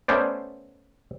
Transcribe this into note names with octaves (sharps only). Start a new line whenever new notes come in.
A3 B3 C#4 C5 D5